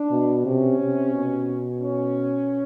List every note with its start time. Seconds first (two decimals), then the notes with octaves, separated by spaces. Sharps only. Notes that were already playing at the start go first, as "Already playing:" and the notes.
Already playing: D4
0.11 B2
0.45 C3 C#4
0.79 C3
1.13 B2
1.81 C#4